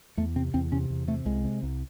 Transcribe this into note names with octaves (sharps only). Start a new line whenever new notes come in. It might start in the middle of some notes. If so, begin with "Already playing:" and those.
E2 A3
C3 C4
E2 C4
C3 C#4
E2
C3 A3
C2 G#3
C3
C2